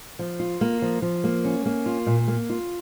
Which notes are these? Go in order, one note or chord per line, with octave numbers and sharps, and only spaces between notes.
F3
F4
A#3
F3
F3
A#3
C#4
A#3
F4
A#2
A#3
F4